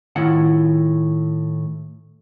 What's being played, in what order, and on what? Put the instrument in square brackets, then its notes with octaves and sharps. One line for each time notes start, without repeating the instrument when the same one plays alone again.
[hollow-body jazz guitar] A2 D#3 E4 F4 F#5